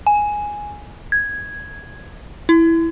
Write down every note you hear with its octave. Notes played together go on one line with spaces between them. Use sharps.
G#5
G#6
E4